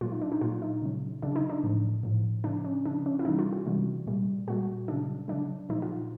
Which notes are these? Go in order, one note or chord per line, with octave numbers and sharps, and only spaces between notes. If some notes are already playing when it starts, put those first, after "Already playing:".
A#2 F#3 F4
D#4
D4
D#4
A#2 F#3 F4
D#4
C#3 F#3
C#3 F#3 D4
D#4
D4
A2 F3
A2 F3
C#3 F3 D4
C#4
C#3 F3 D4
C#4
E4
C3 E3 G3 D#4
F4
F#4
C3 E3 G3
A#2 G3
A#2 G3 F#4
C#3 F#3 D4
C#3 F#3 D4
A#2 F3 D#4
F4